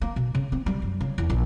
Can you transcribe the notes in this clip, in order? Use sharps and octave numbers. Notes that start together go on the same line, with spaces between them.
A#3
B2
C#3
C4
G3
F#2
C#3
E2
A#1